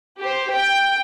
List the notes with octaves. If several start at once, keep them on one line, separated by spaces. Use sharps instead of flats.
G4 C5
G5